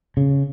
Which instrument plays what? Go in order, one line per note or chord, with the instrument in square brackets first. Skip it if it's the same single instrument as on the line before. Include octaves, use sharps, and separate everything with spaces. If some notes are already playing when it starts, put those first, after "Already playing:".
[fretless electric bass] C#3